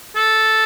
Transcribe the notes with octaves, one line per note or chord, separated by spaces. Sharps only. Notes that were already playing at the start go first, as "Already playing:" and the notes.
A4